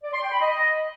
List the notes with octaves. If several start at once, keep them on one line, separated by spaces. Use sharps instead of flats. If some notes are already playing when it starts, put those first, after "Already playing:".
D5
C6
G5
B5
D#5